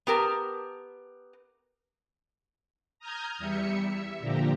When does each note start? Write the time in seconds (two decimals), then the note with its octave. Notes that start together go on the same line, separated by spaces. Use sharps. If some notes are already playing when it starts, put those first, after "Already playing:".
0.07 B3 G4 A#4 A5
2.99 A#5 D#6 F6 G6 G#6
3.39 E2 G3 E5 C#7
3.87 E5
4.20 A#2 D3 F3 G4 A#5